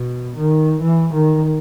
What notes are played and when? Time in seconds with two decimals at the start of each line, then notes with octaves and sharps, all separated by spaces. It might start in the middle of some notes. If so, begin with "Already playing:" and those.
Already playing: B2
0.36 D#3
0.82 E3
1.14 D#3